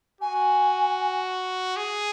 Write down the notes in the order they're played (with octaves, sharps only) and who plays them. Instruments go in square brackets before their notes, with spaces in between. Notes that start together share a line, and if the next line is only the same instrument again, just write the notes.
[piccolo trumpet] F#4 [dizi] G#5
[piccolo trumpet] G#4